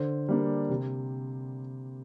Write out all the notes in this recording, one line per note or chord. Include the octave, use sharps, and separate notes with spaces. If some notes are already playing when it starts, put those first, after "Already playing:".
Already playing: D3 C5
G3 A#3 D4
C3